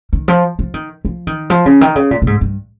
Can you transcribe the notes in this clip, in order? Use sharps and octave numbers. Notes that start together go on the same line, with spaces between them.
D#3
F3
F3
D#3
F3
D#3
F3
C#3
D#3
C#3
A#2
A#2
G#2
G2